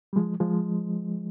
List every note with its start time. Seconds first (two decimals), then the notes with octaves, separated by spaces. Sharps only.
0.13 G3
0.16 F3 G#3
0.40 F3 G#3